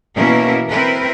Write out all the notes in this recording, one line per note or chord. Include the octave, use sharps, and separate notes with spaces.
B2 E3 A#3 C#4 E4 A#4
C4 E4 A#4 B4